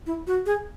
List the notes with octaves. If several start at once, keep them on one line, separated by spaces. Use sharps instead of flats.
E4
F#4
G#4